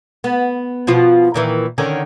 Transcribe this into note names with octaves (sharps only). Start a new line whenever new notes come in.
B3
B2 F3 F4
A#2 D#3 E3
D3 D#3 C#4